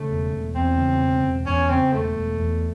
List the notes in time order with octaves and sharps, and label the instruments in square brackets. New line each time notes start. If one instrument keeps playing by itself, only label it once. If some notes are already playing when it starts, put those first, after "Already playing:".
Already playing: [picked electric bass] C#3 [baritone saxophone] A3
[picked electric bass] E1
E1
[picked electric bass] E2 [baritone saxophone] C4
[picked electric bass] C#3
E1
E1
[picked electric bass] E2 [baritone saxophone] C#4
[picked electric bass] C#3 [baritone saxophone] C4
[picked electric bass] E1 [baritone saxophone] A3
[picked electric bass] E1
E2